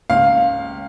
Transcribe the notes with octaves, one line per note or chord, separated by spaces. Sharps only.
C#2 F5